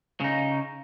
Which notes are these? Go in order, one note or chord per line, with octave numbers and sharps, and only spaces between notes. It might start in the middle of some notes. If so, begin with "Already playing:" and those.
C#3 D#4